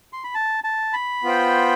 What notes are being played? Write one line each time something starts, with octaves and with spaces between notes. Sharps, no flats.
C6
B5
A5
A5
B5
B3 F4 C5 G5